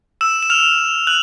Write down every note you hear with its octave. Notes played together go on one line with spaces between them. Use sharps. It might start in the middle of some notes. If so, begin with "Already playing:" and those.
E6 E7
E7
F6 F7
F#6 F#7